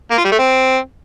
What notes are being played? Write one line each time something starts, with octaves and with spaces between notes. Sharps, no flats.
A#3
F4
G3
A3
C4